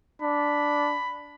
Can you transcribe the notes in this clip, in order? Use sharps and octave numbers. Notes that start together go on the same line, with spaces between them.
D4 B5